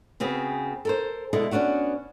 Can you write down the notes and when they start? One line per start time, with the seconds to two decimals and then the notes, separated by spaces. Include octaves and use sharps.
0.20 C#3 B3 C4 F#4 G#4
0.85 A4 A#4 C5
1.33 B2 D3 G#3 E4 A4
1.51 B3 C#4 D4 F#4 G4